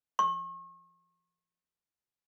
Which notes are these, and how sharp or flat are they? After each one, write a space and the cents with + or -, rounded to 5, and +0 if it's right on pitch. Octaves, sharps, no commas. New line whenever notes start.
C#6 -40